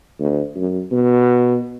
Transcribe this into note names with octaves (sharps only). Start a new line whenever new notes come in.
D2
F#2
B2